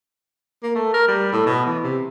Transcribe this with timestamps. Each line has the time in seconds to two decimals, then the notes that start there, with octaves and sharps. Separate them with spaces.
0.63 A#3
0.75 A3
0.94 A#4
1.08 G3
1.33 A2
1.46 B2
1.66 E3
1.84 C3